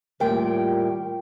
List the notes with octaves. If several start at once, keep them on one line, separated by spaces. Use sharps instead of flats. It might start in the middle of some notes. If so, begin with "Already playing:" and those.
D#2 A2 G3 F4 A#4 G5